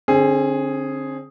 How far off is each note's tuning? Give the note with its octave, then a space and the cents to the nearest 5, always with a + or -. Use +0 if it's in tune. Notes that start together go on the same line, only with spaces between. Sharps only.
D3 +0 C4 +35 G#4 +0